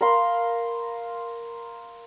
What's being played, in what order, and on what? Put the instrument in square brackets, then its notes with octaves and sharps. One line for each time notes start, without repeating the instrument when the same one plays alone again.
[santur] A#4 F5 B5 C6